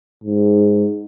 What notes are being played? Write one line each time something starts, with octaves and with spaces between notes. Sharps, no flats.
G#2